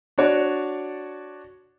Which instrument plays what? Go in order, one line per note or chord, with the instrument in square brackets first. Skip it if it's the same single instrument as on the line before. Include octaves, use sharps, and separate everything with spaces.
[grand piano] D4 F#4 C#5 D5